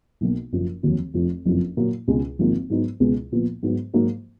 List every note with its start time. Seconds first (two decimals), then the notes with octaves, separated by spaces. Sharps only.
0.21 B1 B2 A#3
0.53 F#1 F#2 F3
0.83 F1 D#2 D#3 F#3
1.14 F1 F2 F3
1.45 F#1 F2 F3
1.77 A#2 F#3 A#3
2.08 C#2 B2 G#3
2.39 G#1 G#2 F3 A#3
2.70 G#2 F#3 B3 D#4
3.00 C#2 B2 G#3 B3
3.32 A#2 F3 B3
3.63 G#2 F#3 B3
3.93 G#2 F#3 A#3